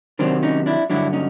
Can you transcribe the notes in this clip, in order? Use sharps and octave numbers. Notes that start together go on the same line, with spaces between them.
C3 D#3 F#3 C4 D4
C#4 D#4
D4 E4
G2 D3 F#3 D4 E4
C#4 D#4